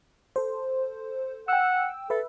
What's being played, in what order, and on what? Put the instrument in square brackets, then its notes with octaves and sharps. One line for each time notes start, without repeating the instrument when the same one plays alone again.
[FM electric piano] A4 C5
[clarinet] F#5 [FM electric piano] G5 E6
[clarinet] A4 [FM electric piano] B4 E5